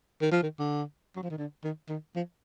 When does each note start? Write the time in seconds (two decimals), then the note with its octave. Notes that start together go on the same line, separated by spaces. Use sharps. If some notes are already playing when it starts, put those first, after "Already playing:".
0.22 D#3
0.32 F3
0.43 D#3
0.59 D3
1.16 F#3
1.23 F3
1.31 D#3
1.38 D3
1.64 D#3
1.89 D#3
2.16 F3